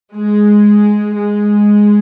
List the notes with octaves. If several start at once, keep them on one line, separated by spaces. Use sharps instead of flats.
G#3
G#3